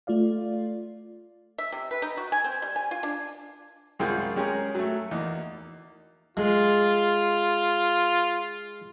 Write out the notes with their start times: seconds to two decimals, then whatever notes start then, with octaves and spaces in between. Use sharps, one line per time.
0.07 A3 F4 D5 F5
1.58 E5
1.72 C3
1.91 B4
2.02 D#4
2.17 F#4
2.32 G#5
2.44 C4
2.62 G3
2.76 G#5
2.91 F4
3.03 D4
3.99 C2 F#2 G#3 F4 G#4 G5
4.36 G#3 C#4 G4 G#4 A#4
4.75 F#3 A3
5.11 E2 A#3 D#4
6.37 G#3 F4